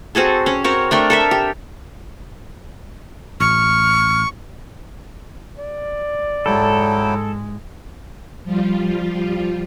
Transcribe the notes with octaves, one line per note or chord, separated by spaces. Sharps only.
C4 F#4 G#4 A4
C#4
C4 F#4 A#4 C#5
A3 D4 A#4 G5
A4 A#4 E5
G4
A1 C#6 F6
D5
G#2 F#3 G#3 E4 A4 G5
F3 G3 F4